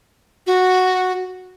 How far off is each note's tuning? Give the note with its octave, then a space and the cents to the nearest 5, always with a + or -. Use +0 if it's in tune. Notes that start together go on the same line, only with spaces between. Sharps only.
F#4 -5